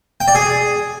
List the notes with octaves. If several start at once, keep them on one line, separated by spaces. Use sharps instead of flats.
G5
D5
G#4